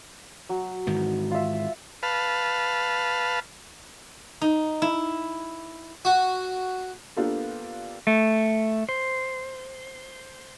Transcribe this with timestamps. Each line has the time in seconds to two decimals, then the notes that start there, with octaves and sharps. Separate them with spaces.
0.49 F#3
0.87 G#2 D#3 E3
1.31 F4 E5
2.03 B4 F5 A5
4.42 D#4
4.82 E4
6.05 F#4
7.17 A#3 B3 D4 F4 G4 A4
8.07 A3
8.89 C5